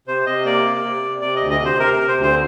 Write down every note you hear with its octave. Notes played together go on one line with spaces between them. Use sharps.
C3 C5
C3 D#5
A#3 D5
C3
C3
C3
C3 D5
D2 D#5
D#5
C3
C5
C3 A#4
C3 A#4
C5
D2
C5